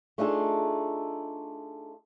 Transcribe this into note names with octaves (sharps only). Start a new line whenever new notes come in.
A3 D4 D#4 F4 G#4 A4